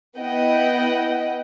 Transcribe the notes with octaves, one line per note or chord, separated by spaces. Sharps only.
B3 E4 D#5 F#5 G5